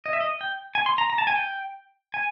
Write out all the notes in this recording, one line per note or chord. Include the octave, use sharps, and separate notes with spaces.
D#5
E5
D#5
G5
G#5
C6
A#5
A#5
A5
G#5
G5
G#5